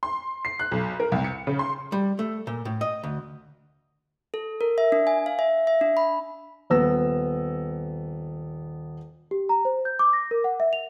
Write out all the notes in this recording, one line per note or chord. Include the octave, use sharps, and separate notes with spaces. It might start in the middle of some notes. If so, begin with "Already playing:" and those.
C6
C7
F#6
B1
A#4
C2
C#7
C#3
C6
G3
A3
A#2
A2
D#5
D2
A4
A#4
E5
D4
G#5
F5
E5
E5
D4
B5
D#1 B3 E6 A#6
G4
A#5
C5
G6
D6
A#6
A#4
F#5
E5
F7